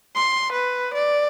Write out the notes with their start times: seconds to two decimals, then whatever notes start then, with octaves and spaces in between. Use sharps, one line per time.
0.15 C6
0.53 B4
0.94 D5